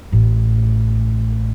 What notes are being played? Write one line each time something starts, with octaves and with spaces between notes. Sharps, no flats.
A1 A2